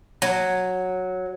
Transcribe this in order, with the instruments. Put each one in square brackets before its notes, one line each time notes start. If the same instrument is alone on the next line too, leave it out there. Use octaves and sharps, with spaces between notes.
[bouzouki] F#3